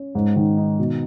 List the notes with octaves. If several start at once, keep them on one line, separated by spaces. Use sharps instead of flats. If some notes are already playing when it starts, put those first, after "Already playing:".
Already playing: C#4
G#2
D#3
D#4
B2